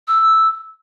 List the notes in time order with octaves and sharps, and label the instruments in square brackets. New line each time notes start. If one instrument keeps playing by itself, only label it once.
[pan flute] E6